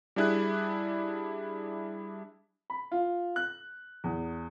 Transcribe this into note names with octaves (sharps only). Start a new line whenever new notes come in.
G3 D4 E4 G#4 F#6
B5
F4
F#6
E2